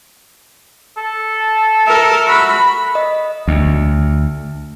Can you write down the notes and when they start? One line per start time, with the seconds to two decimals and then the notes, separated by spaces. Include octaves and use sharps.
0.97 A4
1.87 A4 A#4 E5
2.28 F#4 B5
2.95 D#5
3.48 D2